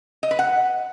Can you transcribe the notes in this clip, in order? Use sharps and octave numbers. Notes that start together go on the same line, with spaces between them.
D#5
B4
F#5